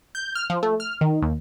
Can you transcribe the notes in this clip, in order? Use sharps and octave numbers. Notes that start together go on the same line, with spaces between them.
G6
F6
F3
A3
F6
D#3
D#2